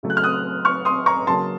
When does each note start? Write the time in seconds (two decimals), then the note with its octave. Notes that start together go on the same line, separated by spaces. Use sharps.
0.03 C#3 F#3 A3
0.10 F#6
0.17 F6
0.23 D#6 F#6
0.65 C#6 F6
0.85 C6 D#6
1.06 A#5 C#6
1.27 C#3 F#3 A#3 C#4 A5 C6